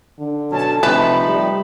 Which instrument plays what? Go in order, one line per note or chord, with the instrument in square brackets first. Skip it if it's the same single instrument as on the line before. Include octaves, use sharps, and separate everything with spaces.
[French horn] D3
[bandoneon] B2 F#3 C#4 [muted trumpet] A5
[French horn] C3 [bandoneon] F3 A3 D#4 [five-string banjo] B4 A5 [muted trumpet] B5
[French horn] G3